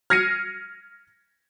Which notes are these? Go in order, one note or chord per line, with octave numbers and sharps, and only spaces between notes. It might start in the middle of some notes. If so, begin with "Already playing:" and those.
F6 G#6 A#6 C7 C#7 D#7